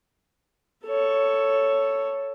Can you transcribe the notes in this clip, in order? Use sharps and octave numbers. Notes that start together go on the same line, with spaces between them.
A4 C#5